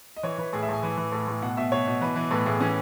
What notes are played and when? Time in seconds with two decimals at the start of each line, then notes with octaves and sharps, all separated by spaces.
0.16 D#5
0.23 E3 C#5
0.38 E3 B4
0.53 A2 G#4
0.63 E5
0.69 A2 G#5
0.83 E3
0.97 E3
1.12 A2
1.28 A2
1.42 B2 F#5
1.57 B2 E5
1.72 B2 C#5
1.87 B2
2.01 E3 B4
2.16 E3
2.31 A2 B4
2.46 A2 G#4
2.60 E3 C#4